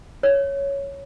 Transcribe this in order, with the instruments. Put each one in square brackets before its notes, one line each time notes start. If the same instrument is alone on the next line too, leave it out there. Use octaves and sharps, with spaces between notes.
[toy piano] C#5